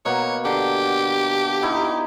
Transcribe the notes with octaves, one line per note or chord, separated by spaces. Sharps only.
B2 A#3 C#5 F#5
D3 G4
D#4 E4 G5